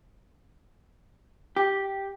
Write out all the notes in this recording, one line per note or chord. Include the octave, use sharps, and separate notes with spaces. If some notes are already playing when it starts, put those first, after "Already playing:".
G4